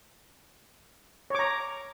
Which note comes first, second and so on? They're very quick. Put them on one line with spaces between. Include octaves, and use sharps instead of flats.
C#5 D6 A#5